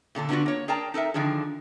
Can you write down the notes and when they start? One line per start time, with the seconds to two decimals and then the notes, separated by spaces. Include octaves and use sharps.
0.15 A#2 D3 D4 A4
0.29 D3 F#3 B3 D4 F4 F#4
0.46 A#3 C#5
0.68 G#4 A#4 D5 G5 A5 A#5
0.94 D#4 A4 A#4 E5
1.14 D3 D#3 F3 D4 G#4